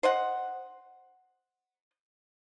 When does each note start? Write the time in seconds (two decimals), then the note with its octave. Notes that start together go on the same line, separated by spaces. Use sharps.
0.03 C5 D#5 F#5